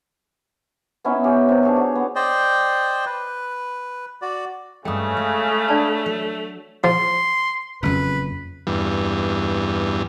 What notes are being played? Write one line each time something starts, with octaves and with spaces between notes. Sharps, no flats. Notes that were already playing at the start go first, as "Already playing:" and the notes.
B3 C#4 D#4 E4
C#4 G4
C3 D#4
D4 G#4 C#5
F#4
B3
C5 D5 D#5 G5
B4
F#4 D5
G2 C#3 G#3 A3 G5 D#6
G#3
D4 D5 A5
F#3
F3 C6
F#1 F2 C#3 B4
E2 G2